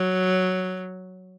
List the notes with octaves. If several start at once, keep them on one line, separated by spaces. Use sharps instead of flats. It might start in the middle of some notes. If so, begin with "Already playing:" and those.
Already playing: F#3